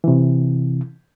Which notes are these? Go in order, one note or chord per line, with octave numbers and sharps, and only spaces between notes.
C3 E3